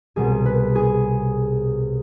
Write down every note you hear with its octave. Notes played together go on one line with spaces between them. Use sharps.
C2 B2 G#4
B4
G#4